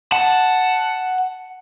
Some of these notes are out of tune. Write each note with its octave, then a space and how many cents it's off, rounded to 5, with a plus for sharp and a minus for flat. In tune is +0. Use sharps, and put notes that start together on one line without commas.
F#5 +0 A5 +0